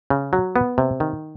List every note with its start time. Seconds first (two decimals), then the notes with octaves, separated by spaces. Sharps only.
0.10 C#3
0.33 F#3
0.56 B3
0.78 C3
1.00 D#3